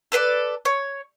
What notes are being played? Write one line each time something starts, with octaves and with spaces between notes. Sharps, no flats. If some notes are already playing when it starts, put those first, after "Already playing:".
A4 B4 C5 D5
C#5